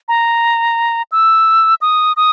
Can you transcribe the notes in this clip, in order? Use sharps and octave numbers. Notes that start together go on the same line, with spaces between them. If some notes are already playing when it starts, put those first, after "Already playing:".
A#5
E6
D#6
D#6